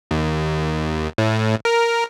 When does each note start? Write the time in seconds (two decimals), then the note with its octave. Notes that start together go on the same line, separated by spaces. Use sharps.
0.11 D#2
1.18 A2
1.65 A#4